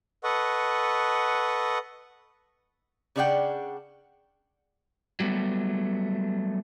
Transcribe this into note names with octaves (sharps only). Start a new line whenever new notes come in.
A4 B4 D#5 F#5 C#6
C#3 D4 G#4 D5 F#5 G5
F#3 G3 A3 B3